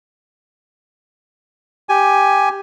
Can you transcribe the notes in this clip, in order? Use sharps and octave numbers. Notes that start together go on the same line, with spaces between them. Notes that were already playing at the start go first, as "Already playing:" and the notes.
G4 G#5